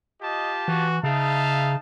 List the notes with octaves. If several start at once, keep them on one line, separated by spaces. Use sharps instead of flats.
F4 G4 D#5 A5
E3 F#4
C#3 D#4 E5 F5 A5